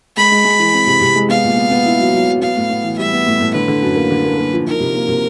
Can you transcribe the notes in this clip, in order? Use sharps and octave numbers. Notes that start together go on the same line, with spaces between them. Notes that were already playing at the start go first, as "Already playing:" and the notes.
G#3 B5
G#3
G#3
E3
C4
C3
C3
G#3
B3 F5
A#2
B3
B3
E4
F#3
F#3
F#3
B3 F5
A2
B3
E3
G3 E5
B3
A2
A2
D3 B4
D3
F#2
A#3
D3
A#3
A#3
F3
D#4 A#4
C3
A#3
C3